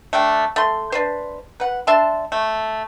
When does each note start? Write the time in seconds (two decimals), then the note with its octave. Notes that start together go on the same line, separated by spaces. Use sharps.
0.13 A3 D4 G5
0.56 A3 C6
0.92 D4 B4 C5
1.60 B4 F#5
1.87 D4 E5 A5 C6
2.32 A3